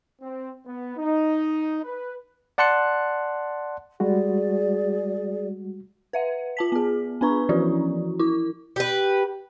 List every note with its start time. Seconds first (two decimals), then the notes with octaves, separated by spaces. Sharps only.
0.21 C4
0.66 B3
0.97 D#4
1.84 B4
2.58 D5 F#5 A5 C6 F#6 C#7
4.00 G3 G#3 F#4 G#4 D5
6.13 B4 E5 F#5
6.57 F4 A5 B6
6.72 B3 G#4
7.21 B3 D4 B4 A#5 C#6
7.49 E3 F3 C#4 E4 F#4
8.19 E4 D6
8.76 G4 B4